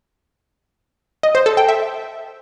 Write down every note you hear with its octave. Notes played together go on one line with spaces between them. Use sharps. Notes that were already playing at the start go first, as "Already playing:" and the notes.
D#5
C5
A4
G5
E5